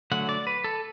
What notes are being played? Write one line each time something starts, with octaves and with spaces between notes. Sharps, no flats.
D3 F#3 A3 F#5
D5
B4
A4